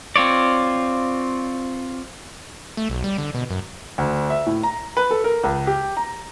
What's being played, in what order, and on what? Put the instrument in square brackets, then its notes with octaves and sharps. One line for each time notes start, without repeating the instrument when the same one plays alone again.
[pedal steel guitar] C4 F4 C#5 D5
[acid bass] A3
B1
G3
D3
B2
F#2
[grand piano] D2
E5
A2
A#5
B4
A4
A#4
C#2
G4
A#5